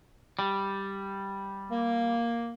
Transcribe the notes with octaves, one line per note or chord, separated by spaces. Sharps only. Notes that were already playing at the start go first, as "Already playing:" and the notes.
G3
A#3